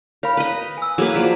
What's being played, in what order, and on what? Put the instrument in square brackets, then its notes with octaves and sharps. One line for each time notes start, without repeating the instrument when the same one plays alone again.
[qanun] A#4 [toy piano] C#5 F5 B5
[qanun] B4 D#5 [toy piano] C#5
[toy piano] G#5 E6
[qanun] F#3 A#3 B4 [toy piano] G#4
[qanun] F3 D5 B5